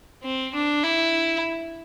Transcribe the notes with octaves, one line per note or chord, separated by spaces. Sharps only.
C4
D4
E4